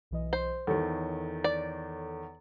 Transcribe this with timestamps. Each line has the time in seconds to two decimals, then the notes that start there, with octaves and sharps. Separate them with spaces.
0.11 B1 E3 D#5
0.33 C5
0.67 E2 D#3 A4 C#5
1.44 D5